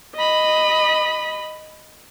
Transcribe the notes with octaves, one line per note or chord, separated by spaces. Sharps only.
D#5 B5